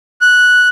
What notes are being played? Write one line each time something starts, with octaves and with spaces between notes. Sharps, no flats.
F#6